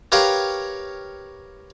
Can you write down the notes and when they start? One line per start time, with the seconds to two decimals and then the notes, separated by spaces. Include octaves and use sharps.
0.12 G4 A#4 B4 C#5 F5 G5